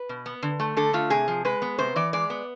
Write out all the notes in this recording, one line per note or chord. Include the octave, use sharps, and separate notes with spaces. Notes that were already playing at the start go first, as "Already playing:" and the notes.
Already playing: B4
B2
B3
D3
A3
D3 A4
A3 F4
C3 G#4
F3
G#3 B4
B3
C3 C5
E3 D5
G#3 D5
B3